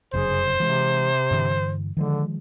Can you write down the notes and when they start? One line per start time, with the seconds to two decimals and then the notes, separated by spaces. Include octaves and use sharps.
0.14 F1 F#2 C#3 G#4 C5
0.60 C3 E3 G#3
1.31 G2 D3 E3
1.97 D3 D#3 F3 G#3